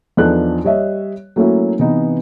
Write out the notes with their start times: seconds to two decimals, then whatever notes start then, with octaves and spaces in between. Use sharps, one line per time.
0.17 E2 F3 D4 D#4 A4 F#6
0.64 G3 C#5 D#5 E5
1.36 F#3 A3 A#3 C#4 E4
1.79 C3 E3 B3 D#4